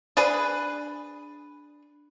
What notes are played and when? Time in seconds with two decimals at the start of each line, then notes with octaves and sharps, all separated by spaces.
0.17 D4 G#4 B4